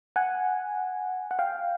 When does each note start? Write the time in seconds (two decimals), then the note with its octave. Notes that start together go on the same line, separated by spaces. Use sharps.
0.16 F#5 G#5
1.31 F#5
1.39 F5 G5